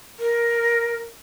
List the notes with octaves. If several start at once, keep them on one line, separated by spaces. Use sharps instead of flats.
A#4